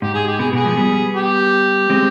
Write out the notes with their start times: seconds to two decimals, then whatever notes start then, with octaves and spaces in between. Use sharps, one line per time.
0.02 G#2 G4
0.15 G#4
0.28 G4
0.39 B2 G#4
0.53 B2 G#4
0.64 F3 G#3
0.77 G3 B3
1.14 G4
1.90 G#3 C4